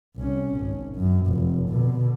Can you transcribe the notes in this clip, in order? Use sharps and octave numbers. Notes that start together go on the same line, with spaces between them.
C2 C#4
G#1
F#2
F1
B2 D3